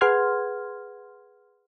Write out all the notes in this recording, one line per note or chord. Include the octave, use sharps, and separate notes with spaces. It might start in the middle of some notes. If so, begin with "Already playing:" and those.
G#4 B4 F#5 C6 F6 G#6